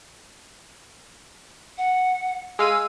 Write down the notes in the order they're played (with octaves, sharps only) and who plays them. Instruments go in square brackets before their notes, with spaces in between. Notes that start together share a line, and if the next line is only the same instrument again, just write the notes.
[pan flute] F#5
[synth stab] G#3 F5 D#7 [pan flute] E6